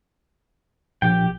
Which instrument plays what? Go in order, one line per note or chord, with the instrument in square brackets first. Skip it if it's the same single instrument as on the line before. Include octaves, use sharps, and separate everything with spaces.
[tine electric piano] A#1 A#2 [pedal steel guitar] G4 G5